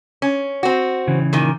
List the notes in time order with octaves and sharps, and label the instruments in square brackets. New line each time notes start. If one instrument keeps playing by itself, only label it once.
[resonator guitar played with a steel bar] C#4
C4 F#4
[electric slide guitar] C#3 E3
[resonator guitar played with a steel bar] A#2 D#3